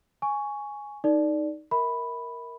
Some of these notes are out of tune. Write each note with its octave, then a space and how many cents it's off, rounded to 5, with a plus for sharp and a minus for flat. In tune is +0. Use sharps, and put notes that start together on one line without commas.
G#5 +0 C#6 +10
D#4 +0 A4 +15 D5 +0
A#4 +0 E5 -35 B5 +0